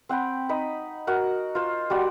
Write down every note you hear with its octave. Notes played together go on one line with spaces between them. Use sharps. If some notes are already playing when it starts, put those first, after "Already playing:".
C4 F#5 G5 B5
D#4 D#5 B5
F#4 A#4 F#5
F4 C5
G3 F#4 D5 F#5